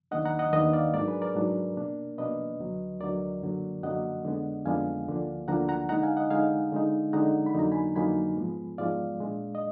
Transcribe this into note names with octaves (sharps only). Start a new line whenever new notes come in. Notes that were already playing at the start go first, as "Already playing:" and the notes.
D#2 D#3 A#3 D4 D#5 F#5
F#5 A#5
D#5 F#5
D#2 D#3 A#3 D4 B4 D#5
D5 F5
G#2 F#3 D4 A#4 D5
G#4 B4
A#4 D5
G#2 F#3 D4
B2 A#3 D4
B2 A#3 D4 B4 D#5
D2 D3 F#3
D2 D3 F#3 A#4 D5
F#2 D3 F#3 A#3
F#2 D3 F#3 A#3 D#5 F#5
F2 D3 G#3 B3 D4
F2 D3 G#3 B3 D4 F5 G#5
D2 D3 F3 A#3 D4
D2 D3 F3 A#3 D4 F#5 A#5
F#5 A#5
D3 G#3 D#4 F#5 A#5
F5 G#5
D#5 F#5
D3 G#3 D#4 F5 G#5
D3 G#3 D#4
D3 G#3 D#4 F#5 A#5
B5
F2 D3 F#3 A#3 D#4 A#5
G#5 B5
F2 D3 F#3 A#3 D#4 G#5 B5
G#2 F3 G#3 B3
G#2 F3 G#3 B3 D5 F5
A#2 G#3 D4
D#5